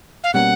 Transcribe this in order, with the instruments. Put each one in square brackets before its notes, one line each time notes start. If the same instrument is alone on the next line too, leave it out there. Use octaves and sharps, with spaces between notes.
[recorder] F5
[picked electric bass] B2 G3 A#3 C#4 [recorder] F#5